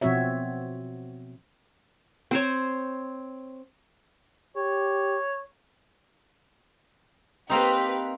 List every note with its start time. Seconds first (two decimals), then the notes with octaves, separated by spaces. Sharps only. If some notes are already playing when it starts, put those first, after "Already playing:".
0.01 B2 F3 C4 F#4 C#5 E5
2.31 C4 C5 C#5
4.56 G4 C#5
7.50 A#3 C4 D#4 G4 B4